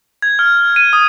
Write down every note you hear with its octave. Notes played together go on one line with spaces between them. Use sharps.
G#6
F6
D#7
D#6